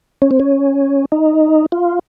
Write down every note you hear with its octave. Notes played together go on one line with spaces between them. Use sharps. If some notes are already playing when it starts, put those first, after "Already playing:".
C#4
C4
C#4
D#4
F4